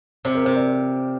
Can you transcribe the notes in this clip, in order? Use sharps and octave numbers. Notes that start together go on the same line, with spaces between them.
C3 C5
A#4
C3 C5
D5